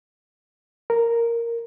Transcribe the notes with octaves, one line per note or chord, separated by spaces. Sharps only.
A#4